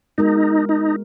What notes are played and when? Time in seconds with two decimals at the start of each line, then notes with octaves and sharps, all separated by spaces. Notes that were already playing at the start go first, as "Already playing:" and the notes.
0.18 G#3 B3 D#4 F#4 A#4
0.69 D#4